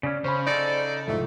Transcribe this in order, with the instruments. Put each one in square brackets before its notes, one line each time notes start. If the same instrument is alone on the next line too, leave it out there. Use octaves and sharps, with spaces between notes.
[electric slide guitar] C#3 C#4 [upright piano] D5
[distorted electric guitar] C#3 [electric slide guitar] C#4 [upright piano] C5 B5
[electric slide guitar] D#4 A4 [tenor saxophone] D5
[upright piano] C2 G#2 F3 [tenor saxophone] A3